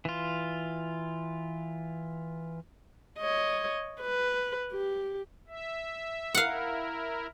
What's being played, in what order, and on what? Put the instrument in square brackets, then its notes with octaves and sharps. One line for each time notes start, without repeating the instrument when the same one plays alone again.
[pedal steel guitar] E3 F4
[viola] C#5 D#5
B4
G4
[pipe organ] E5
[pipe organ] E4 A#4 [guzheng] F5 F#5